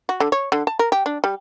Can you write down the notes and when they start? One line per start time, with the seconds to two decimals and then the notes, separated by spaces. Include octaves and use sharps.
0.09 F#4
0.20 D3
0.32 C#5
0.52 D3
0.67 A5
0.79 A#4
0.92 G4
1.06 D4
1.24 G3